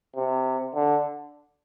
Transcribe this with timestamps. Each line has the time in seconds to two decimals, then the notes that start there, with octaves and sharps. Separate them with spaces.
0.16 C3
0.75 D3